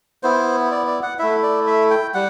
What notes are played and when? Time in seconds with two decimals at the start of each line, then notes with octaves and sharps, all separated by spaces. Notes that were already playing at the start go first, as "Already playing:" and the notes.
0.23 B3 E4 C5
0.71 D5
0.87 D5
1.03 F#5
1.19 A3 E4 E5
1.43 D5
1.67 E5
1.91 G5
2.14 G3 F#5